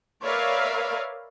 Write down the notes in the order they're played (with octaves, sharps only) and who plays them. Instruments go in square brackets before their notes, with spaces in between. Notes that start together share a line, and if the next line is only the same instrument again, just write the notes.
[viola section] A#4 B4 C#5 D5 E5 F5